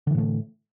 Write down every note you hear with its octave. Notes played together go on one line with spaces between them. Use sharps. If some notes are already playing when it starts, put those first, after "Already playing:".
A2 D3 E3 A3